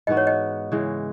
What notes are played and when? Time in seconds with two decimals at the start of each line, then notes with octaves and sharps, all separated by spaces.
0.07 G#2 E3 B3 F#4 D#5
0.17 C#5
0.27 D#5
0.72 C#3 E3 G#3